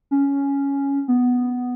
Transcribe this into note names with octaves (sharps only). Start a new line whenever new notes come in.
C#4
B3